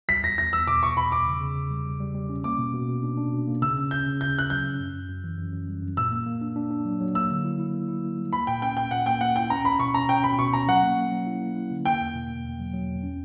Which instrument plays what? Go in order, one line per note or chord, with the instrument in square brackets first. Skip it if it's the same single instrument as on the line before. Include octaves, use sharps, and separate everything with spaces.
[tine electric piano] G3 [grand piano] B6
[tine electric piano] E2 [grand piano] A#6
[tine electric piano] E2 [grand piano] A#6
[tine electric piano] E2 [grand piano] E6
[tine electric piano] B2 [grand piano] D6
[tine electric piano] E2 [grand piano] C#6
[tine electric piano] B2 [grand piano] B5
[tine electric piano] E2 [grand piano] D6
[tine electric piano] C#3
C#3
C#3
G3
G3
G3
G3
C#4
[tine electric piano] A#3 [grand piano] D6
[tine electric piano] B2
B2
B2
D4
D4
B2
A#3
[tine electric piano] C#3 [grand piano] E6
[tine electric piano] C#4
[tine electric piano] C#4 [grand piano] G6
[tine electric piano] C#3
[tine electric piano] C#3 [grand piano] G6
[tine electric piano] C#3 [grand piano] F#6
[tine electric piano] F#3 [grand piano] G6
[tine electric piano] C#4
F#2
F#2
F#2
E3
F#2
F#2
G3
F#2
[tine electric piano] A#2 [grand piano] E6
[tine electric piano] A#3
A#3
D4
D4
D4
F#3
F#3
[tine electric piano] A#3 [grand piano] E6
[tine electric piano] D3
E4
E4
A#3
E4
A#3
G3
[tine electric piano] A#3 [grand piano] B5
[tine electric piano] A#2 [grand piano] G5
[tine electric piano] C#4 [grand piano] G5
[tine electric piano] A#2 [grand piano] G5
[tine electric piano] A#2 [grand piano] F#5
[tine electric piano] A#3 [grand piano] G5
[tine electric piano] A#3 [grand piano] F#5
[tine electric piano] E4 [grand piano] G5
[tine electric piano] C#4 [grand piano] A#5
[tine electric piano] C#4 [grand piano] B5
[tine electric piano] B2 [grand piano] C#6
[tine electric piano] C#4 [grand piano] A#5
[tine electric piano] C#4 [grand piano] G5
[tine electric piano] B2 [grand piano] B5
[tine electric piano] B2 [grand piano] C#6
[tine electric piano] C#4 [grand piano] A#5
[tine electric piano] F#3 [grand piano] F#5
[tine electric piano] A#3
A#3
F#3
E4
A#3
E4
D3
[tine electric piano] A#3 [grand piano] G5
[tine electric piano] E2
B2
A#3
E2
F#3
F#3
E2
C#4